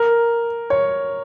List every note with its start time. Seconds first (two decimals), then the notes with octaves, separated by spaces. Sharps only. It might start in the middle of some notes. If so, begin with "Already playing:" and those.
Already playing: A#4
0.70 C#5